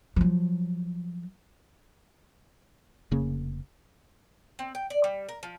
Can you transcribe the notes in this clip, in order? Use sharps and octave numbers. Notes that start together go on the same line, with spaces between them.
F3 F#3
F1 C#3 A#3 C#4
C4
G5
D5
G3
A#4
F3